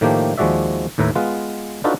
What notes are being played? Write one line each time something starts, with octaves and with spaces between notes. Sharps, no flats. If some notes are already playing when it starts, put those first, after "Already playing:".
A2 D#3 F3 A3 A#3 G4
D#2 F3 G#3 F#4 D5 E5
D#2 A2 B4 E5 A#5
G#3 B3 F4 B4
D4 D#4 F4 F#4 A4 B4